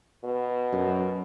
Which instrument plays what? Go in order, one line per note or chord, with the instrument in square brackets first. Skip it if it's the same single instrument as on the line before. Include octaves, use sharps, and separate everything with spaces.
[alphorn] B2
[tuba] F#2